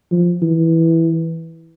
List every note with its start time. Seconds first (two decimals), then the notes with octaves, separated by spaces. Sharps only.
0.12 F3
0.42 E3